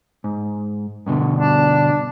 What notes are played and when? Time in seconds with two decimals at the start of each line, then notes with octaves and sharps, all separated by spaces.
0.24 G#2
1.06 G2 B2 D3
1.33 D4